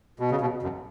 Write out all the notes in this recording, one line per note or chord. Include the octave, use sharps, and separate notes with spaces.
B2
C#3
B2
F#2